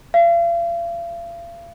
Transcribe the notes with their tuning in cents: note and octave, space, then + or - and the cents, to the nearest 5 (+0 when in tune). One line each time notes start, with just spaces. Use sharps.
F5 -40